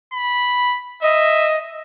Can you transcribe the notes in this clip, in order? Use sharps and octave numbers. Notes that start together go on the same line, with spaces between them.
B5
D#5 E5